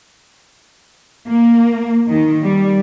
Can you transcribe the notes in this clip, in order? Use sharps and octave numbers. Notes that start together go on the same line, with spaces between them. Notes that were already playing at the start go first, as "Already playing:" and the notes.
A#3
D#3
G3